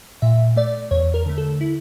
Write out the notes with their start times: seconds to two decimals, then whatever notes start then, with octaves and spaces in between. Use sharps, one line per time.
0.22 A#2 E5
0.56 A3 D5
0.91 E2 C#5
1.14 A#4
1.26 D3 A3
1.38 A4
1.61 E4